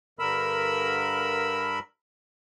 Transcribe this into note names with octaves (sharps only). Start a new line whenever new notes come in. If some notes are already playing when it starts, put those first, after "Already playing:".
G2 D3 A#4 B5 E6